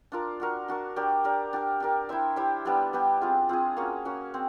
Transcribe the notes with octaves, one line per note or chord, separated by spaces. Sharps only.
D4 F4 A#4
D4 F#4 A#4
D4 F#4 A#4
D4 G4 A#4 D5
D4 G4 A#4 D5
D4 G4 A#4
D4 G4 A#4
E4 G4 C5 E5
E4 G4 C5 E5
G3 B3 D4 G4
G3 B3 D4 G4
C4 F4 G#4
C4 F4 G#4
A#3 C#4 F#4
A#3 C#4 F#4
C4